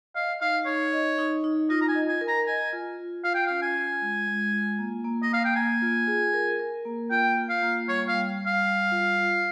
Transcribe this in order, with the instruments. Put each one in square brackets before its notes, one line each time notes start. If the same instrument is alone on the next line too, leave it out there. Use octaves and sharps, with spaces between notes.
[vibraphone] D#5 [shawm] F5
[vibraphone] D#4 [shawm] F5
[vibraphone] D#4 [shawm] C#5
[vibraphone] D#5
D#4
D#4
[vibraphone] F4 [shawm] D#5
[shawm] A#5
G#5
[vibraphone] D#5
[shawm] G#5
[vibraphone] A#4
[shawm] A#5
[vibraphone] D#5 [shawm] G#5
[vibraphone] F4
F4
[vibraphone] F4 [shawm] F5
[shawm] G5
[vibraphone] C#4 [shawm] F5
[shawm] G#5
[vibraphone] F4
G#3
G#3
F4
A#3
A#3
[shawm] D#5
[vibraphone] A#3 [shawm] F5
[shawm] G5
[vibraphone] A#3 [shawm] G#5
[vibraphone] F4
G#4
A#4
A#4
A#3
[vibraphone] F4 [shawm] G5
[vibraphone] F4
[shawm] F5
[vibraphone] A#3
[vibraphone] G3 [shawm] C#5
[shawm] F5
[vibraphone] G3
G3
[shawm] F5
[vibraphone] G3
F4
F4